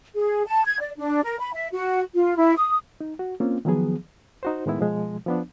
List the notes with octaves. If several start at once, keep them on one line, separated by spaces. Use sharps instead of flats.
G#4
A5
G#6
D5
D4
A#4
B5
E5
F#4
F4
E4
D#6
D#4
F#4
A#3 C4 C#4 F4
D#3 F3 F#3 B3 G#4
D#4 F#4 C5
A2 D#3 G#3 B3 E4
B2 F3 G#3
F3 B3 D4